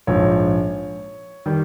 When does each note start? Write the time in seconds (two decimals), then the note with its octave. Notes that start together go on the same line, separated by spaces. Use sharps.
0.07 A#1 G#2 F3 G#3 C#5
1.46 D#3 G3